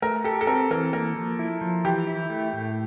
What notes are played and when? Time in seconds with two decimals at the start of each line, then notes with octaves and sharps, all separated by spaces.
0.02 A3 A#4
0.24 G4 A4
0.41 A4
0.47 C4 A#4
0.70 E3 A#4
0.93 A#3 A#4
1.16 F3
1.39 E4
1.61 F3
1.85 E3 G4
2.07 E4
2.30 A3
2.53 A2